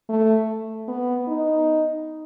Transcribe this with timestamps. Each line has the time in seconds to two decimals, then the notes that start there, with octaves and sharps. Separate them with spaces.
0.09 A3
0.88 B3
1.28 D#4